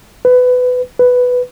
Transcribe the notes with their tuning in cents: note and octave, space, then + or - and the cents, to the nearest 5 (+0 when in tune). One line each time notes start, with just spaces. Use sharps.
B4 +20
B4 +5